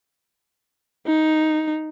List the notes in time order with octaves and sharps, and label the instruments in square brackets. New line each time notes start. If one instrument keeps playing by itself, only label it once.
[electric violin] D#4